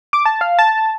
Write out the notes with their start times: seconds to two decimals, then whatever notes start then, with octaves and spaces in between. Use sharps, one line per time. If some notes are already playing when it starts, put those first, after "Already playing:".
0.13 D6
0.25 A5
0.41 F5
0.59 A5